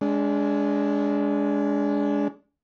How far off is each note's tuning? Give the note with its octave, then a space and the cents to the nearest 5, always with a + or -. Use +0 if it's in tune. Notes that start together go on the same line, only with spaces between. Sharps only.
G#3 +0 D4 -30